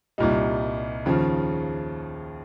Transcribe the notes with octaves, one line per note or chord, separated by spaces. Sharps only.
C2 A#2 G3 D#4
D#2 C#3 F3